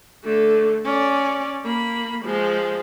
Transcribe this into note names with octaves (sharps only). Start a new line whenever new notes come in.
D3 A3
C#4 D5
A#3 B5
F3 G#3